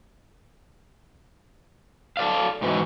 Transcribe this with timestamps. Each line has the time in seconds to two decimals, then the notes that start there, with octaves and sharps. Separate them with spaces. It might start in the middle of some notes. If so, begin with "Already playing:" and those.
2.17 A4 D5 F5
2.62 G#2 B2 E3